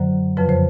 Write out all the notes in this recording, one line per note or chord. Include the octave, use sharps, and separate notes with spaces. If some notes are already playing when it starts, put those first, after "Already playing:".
Already playing: F#2 D3 F#3 C5
F2 C#3 F3 B4
C5